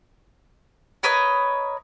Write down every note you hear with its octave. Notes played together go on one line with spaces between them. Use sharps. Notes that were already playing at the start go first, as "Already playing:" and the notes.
A#4 B4 C#5 D#5